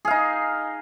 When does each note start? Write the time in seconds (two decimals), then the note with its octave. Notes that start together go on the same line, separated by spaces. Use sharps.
0.05 G#4
0.08 F5
0.10 D#4